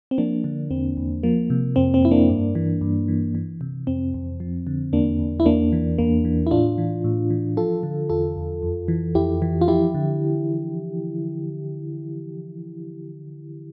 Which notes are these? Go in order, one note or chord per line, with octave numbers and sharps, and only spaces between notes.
C4
F3 A#3 D4
D3
E2 C4
E2
F3 A#3
C3
F2 C4
C4
F2 E4
A#3 D4
G2
E3
G2
E3
E3
C3
F2 C4
F2
F3
D3
E2 A#3 D4
E2
E4
E2 A#3 D4
E3
E2 A#3
E3
E4
A2 D4 F4
E3
A2
E3
F3 F4 A4
D3
E2 F4 A4
E2
F2
E3
F2 E4 G4
E3
F4
F3 E4 G4
D3